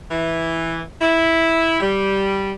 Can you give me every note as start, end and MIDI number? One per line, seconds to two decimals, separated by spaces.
0.11 0.80 52
1.02 1.80 64
1.80 2.51 55